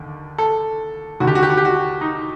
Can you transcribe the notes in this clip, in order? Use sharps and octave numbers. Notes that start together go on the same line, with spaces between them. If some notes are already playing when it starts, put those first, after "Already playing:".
Already playing: D#2 D3
A4
D#2 D3 F#4
G4
F#4
G4
F#4
G4
F#4
D#4